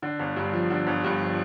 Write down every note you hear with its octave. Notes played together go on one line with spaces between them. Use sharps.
D3
G1
G2
F3
D3
G1
G2
F3